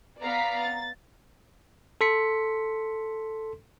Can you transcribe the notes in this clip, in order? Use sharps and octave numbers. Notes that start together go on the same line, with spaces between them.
B3 D5 F5 A#5 B6
A6
A4 C6 B6 C#7